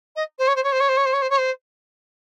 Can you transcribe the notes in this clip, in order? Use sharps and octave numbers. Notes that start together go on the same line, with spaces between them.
D#5
C5
C#5
C5
C#5
C5
C#5
C5
C#5
C5
C#5
C5
C#5
C5